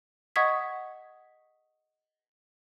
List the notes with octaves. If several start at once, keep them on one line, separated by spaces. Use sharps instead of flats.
D#5 F#5 C#6 D#6 G#6 B6